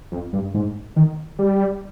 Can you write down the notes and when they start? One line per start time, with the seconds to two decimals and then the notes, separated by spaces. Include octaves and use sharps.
0.12 F2
0.33 G2
0.54 G#2
0.96 D#3
1.39 G3